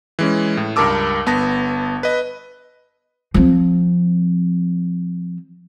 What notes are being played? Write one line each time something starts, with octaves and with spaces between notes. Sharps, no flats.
E3 G#3 C#4
A2
C#2 G2 A#4 A5 D6 E6
G1 B3 A5 A#6
B4 D#5
F3 C4